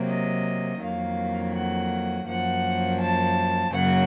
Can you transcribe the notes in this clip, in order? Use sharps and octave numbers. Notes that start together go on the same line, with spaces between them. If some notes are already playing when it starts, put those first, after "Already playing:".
Already playing: C3 F#3 A#3
D#5
F2 D#3 F#3 A#3 F5
F#5
F#2 F3 A#3 F#5
A5
F#2 C#3 F#3 A#3 F#5